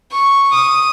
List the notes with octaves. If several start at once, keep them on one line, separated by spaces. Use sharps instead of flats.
C#6
D#6